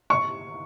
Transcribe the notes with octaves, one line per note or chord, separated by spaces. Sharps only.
C#6